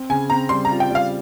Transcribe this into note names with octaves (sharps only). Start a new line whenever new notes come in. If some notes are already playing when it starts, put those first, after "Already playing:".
Already playing: C4
C#3 G#5
C4 A#5
G3 C6
A#5
F4
G5
G3 F5